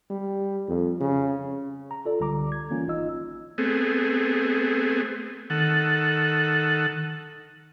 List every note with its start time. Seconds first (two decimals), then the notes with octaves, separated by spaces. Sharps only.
0.11 G3
0.68 F2
1.01 C#3
1.91 A#5
2.05 F4 A4 D5
2.20 C#2 D3 G3 A#5 D6
2.52 G#6
2.70 E3 A#3 C#4 F4
2.87 G#1 D#4 F4 D#5 E6
3.58 A3 B3 C4 G#4
5.50 D#3 A4 F#5